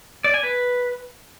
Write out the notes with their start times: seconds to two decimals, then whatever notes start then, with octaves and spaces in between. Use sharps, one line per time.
0.24 D5
0.34 G#5
0.43 B4